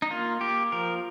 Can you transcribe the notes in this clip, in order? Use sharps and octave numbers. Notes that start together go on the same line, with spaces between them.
D#4
A#3 F4
A#3 G4
F3 A#4